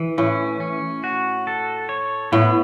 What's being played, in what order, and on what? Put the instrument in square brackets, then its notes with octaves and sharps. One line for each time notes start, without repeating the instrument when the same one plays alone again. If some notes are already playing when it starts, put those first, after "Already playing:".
Already playing: [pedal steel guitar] E3
[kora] A2 [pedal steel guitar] C#4
[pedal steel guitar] C#4
F#4
A4
C#5
[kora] A2 [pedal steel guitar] B3